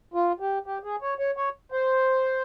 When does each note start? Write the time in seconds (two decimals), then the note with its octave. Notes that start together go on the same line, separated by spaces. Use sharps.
0.14 F4
0.40 G4
0.66 G4
0.84 G#4
1.02 C#5
1.19 C#5
1.37 C#5
1.72 C5